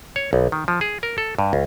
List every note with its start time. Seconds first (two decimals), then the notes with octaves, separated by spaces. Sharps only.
0.16 C#5
0.33 B1
0.52 D#3
0.68 F3
0.81 G#4
1.03 A#4
1.18 A4
1.39 G2
1.53 C#2